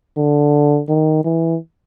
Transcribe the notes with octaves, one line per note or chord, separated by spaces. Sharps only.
D3
D#3
E3